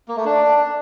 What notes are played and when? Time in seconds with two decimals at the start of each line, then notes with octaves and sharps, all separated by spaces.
0.08 A#3
0.17 A3
0.25 D4